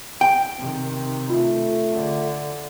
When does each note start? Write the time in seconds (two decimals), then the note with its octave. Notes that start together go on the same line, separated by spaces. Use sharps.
0.21 G5
0.58 C3 D#3
1.30 A3 F4
1.91 D3